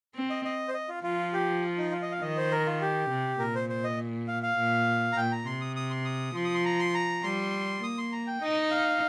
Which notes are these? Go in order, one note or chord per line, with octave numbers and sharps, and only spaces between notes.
C4
D#5
D#5
C5
D#5
F4
F3 F4
G4
F4
D#4
F4
D#5
F5
D#3 D#5
C5
A#4
F4
G4
C3
A#2 A#4
C5
C5
D#5
F5
F5
A#2
A#5
A#2 G5
A#5
C3 C6
D#6
D#6
C6
D#6
F3 C6
D#6
C6
A#5
C6
A#5
G3 C6
A#3 D#6
C6
A#5
G5
D#4 D#5
F5